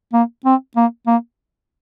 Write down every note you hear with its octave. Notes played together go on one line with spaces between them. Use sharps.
A#3
C4
A#3
A#3